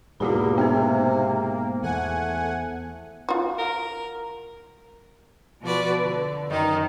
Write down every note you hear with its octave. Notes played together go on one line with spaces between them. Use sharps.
E2 G#2 B2 A#3 F#4 G4 B5
C3 B3 G#4 C5
E2 A3 F#5 G#5
F4 F#4
A#4
B2 F3 F#4 B4 D5
D3
F#2 D#3 D#4